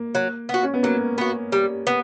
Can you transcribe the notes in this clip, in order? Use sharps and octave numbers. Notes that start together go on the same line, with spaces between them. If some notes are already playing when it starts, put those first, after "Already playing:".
Already playing: A#3
F#3
B3 F#4
C#4
B3
F#3 A#3
B3 F#4
G3
B3